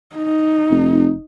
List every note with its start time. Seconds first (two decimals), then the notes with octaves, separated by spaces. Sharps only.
0.16 D#4
0.71 F1